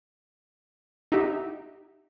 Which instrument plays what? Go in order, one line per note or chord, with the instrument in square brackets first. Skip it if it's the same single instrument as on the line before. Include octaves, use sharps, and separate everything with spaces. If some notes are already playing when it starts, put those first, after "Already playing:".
[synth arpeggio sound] D#4 E4 F#4 G4 E5